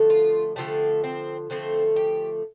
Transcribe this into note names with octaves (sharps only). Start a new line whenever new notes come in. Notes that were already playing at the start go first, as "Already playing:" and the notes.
Already playing: D3 F3 A3
F4
D3 F3 A3 G4
C4
D3 F3 A3 C4
G4